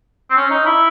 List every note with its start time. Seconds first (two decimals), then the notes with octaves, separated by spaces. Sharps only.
0.30 C4
0.36 C#4
0.51 D#4
0.66 E4